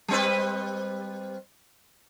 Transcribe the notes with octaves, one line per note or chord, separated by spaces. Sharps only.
G3 C4 B4